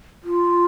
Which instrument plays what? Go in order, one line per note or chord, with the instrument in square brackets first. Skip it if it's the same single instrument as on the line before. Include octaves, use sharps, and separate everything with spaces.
[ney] F4